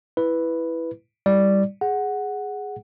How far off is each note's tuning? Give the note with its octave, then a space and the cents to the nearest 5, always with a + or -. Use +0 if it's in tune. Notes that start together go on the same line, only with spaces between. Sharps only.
E4 +0 B4 +0
G3 +0 E4 -15 D5 +0
G#4 +0 F#5 +0